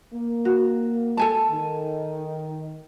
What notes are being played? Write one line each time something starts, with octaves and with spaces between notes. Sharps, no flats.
A#3
F#4
A4 G#5 A5
D#3